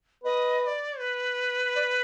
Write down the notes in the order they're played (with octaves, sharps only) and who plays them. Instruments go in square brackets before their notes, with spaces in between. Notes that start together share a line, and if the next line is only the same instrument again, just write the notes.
[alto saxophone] B4 [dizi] D#5
[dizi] D#5
D5
B4
[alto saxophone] D5